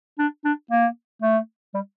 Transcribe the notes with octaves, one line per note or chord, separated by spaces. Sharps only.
D4
D4
A#3
A3
G3